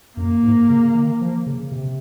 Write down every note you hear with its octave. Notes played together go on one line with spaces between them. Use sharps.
F#2 A#3
G#2
C#3
D#3
F3
C#3
C3